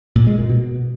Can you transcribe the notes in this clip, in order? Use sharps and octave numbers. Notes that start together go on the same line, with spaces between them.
A#2
G#3
A#2
B2